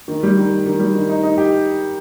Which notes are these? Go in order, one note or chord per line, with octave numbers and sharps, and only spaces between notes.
D#3
G3
D#3
D#3
D#3
G3
D#3
D#4
D#4
G4